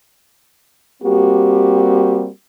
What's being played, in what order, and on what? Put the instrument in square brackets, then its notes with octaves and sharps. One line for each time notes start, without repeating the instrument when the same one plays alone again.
[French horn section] G3 A#3 C4 F#4 G4